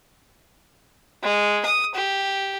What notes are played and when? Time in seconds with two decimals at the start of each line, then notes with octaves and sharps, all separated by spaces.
1.23 G#3
1.66 D#6
1.95 G4